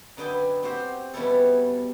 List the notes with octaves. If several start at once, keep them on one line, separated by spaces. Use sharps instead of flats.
F#2 D3 B4 D#5 G5 G#5
C4 F#4 G4 C5
E2 B2 G3 C#4 E4 A4